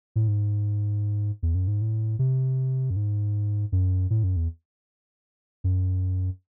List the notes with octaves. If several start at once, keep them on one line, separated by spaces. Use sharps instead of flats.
A2
G#2
E2
F#2
G#2
A2
C3
F#2
G#2
F#2
A2
F#2
E2
F#2